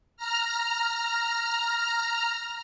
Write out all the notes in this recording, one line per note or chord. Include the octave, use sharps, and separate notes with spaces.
A#5 F6